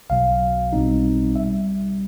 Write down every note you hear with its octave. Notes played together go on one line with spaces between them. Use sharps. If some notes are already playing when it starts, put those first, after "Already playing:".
B1 B2 F#3 F5
B1 B2 G3 C4 D#4
G3 E5